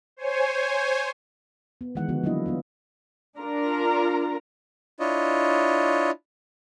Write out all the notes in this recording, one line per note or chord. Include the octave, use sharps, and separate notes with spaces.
C5 C#5 G#5
B3
D#3 E3 G#3 F#5
D3 F3 B3 F#4
F#3 A#3 B3 D4 E4 D#5
B3 D4 F4
D4 F4 A#4 A#5
D4 E4 F4 C#5 D#5